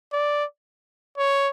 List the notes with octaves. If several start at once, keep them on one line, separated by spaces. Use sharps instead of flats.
D5
C#5